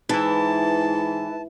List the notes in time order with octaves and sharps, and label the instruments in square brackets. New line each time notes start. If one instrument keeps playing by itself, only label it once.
[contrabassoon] G#2 [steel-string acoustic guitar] E3 [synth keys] E4 B4 [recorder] A5